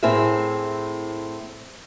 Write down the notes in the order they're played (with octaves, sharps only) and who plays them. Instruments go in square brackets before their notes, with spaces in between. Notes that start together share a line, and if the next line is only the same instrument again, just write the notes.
[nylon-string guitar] A2 C4 E4 G#4 A#4 E5